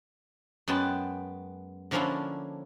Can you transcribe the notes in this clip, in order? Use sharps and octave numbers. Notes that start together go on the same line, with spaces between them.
F#2 G#3 B3 G5 A5
D3 F3 A#3 C#4 D4 E4